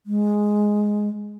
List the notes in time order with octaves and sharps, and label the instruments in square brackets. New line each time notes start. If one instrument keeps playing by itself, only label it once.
[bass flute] G#3